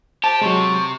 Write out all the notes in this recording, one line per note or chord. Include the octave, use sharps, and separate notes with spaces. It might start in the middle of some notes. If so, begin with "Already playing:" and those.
G4 C5 A5
C3 F#3 G#3 C#6